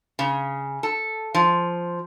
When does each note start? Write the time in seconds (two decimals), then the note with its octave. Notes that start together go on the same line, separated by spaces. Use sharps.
0.19 C#3
0.83 A4
1.34 F3